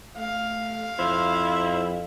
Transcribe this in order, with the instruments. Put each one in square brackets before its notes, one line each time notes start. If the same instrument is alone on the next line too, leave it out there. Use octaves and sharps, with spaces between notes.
[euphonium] A3 [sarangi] F5
[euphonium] F2 [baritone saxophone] E4 [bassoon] C5